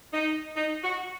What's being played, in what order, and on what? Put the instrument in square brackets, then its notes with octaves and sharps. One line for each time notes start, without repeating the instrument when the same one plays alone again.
[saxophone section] D#4
D#4
F#4